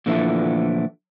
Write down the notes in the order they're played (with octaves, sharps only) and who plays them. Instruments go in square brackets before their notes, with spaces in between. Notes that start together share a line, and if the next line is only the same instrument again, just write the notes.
[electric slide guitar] A#2 D3 E3 F3 A3 E4